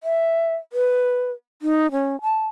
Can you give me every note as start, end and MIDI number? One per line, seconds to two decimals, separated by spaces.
0.03 0.55 76
0.73 1.31 71
1.62 1.91 63
1.92 2.20 61
2.22 2.47 81